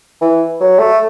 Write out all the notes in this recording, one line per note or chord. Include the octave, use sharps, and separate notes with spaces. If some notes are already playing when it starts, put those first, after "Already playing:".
E3
F#3
A3